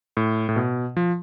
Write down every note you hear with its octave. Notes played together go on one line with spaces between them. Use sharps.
A2
A2
B2
F3